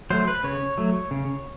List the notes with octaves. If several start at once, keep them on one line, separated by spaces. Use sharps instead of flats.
F#3 A3 C5
B4
C#3 C#5
F#3 A3
C#3